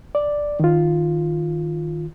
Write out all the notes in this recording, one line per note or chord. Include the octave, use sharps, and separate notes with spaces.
D5
D#3 F4